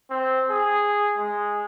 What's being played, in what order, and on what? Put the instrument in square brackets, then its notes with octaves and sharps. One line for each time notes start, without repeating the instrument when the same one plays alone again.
[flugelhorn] C4
G#4
G#3